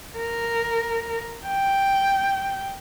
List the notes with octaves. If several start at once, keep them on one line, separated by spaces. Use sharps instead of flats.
A#4
G5